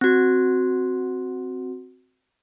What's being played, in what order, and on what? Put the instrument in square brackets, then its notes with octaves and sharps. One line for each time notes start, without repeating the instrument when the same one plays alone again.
[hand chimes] C4 F#4